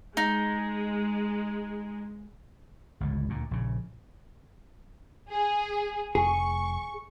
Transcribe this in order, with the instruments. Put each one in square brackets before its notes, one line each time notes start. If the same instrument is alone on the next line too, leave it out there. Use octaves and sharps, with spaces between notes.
[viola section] G#3 [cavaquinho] D#4
[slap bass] G1 C#2 A2
D2 A#2
A#1 C#3
[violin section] G#4
[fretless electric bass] F1 [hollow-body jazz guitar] G#4 [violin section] C#6